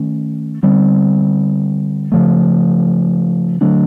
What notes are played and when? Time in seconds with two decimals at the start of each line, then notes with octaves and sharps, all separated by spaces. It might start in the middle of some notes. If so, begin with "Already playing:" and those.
Already playing: D#3 A3 C#4
0.63 D3 G3 C4
2.12 C#3 F3 A3
3.61 D3 F#3 A3 D4